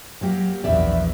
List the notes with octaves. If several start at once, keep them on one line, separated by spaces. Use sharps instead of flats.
F#3 A#3 G4
A#1 E2 D5 E5